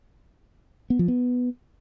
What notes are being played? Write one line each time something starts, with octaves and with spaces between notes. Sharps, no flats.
B3
F3
B3